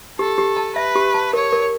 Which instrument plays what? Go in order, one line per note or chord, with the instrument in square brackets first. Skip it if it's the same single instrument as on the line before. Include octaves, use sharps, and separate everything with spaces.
[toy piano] G4 [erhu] A4
[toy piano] G4
A5
[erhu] B4 [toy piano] E5
[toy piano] G4
A5
[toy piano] A#4 [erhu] C#5
[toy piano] A#4